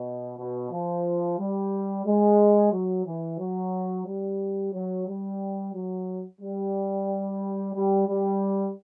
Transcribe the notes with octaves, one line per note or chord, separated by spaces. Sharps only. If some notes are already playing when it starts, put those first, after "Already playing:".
Already playing: B2
B2
F3
G3
G#3
F#3
E3
F#3
G3
F#3
G3
F#3
G3
G3
G3